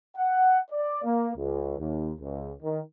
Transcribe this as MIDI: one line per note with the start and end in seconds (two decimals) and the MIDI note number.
0.15 0.58 78
0.71 1.00 74
1.03 1.30 58
1.36 1.75 37
1.78 2.11 39
2.19 2.51 37
2.62 2.80 51